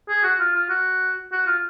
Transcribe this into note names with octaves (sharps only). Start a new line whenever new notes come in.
G#4
F#4
F4
F4
F#4
F#4
F4